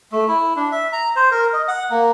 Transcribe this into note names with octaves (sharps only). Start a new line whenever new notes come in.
A3
E4
D4
E5
A#5
C5
A#4
D#5
F#5
A#3